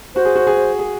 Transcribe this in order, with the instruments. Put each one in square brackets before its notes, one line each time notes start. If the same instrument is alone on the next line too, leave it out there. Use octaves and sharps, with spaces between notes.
[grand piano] F#4 [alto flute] C5
[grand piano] G#4
F#4
G#4
G#4